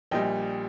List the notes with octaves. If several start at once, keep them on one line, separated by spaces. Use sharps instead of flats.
A#1 A#2 G3 D#5 G5